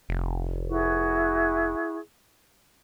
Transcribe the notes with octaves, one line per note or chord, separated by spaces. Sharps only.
F1
E4 F#4 G#4